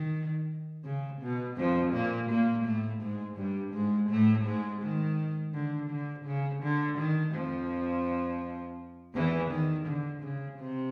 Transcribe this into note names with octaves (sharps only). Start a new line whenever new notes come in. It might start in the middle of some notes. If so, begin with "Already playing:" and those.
Already playing: D#3
C#3
B2
F2 F3
A#2 A#3
A#2 A#3
A2 A3
G#2 G#3
G2 G3
G#2 G#3
A2 A3
G#2 G#3
D#3
D3
D3
C#3
D3
D#3
F2 F3
E2 E3
D#3
D3
C#3
C3